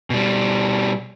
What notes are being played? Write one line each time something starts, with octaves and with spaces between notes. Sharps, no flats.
B2 G3